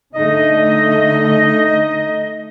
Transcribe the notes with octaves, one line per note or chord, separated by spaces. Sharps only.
D3 A3 D#4 D#5